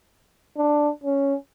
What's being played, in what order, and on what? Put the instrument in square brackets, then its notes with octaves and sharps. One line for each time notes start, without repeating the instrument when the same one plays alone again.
[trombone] D4
C#4